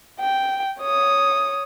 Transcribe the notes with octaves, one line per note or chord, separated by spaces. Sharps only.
G5
C#5 D#6